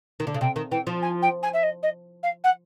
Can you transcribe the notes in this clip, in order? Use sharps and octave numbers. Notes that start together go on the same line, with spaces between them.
D#3
D3
C#3
C3 G5
D#3
E3 G5
F3
G#5
G5
G#5
E5
D#5
D#5
F5
F#5